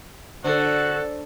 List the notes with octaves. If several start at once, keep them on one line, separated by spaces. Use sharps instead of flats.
D3 F#4 A4 C5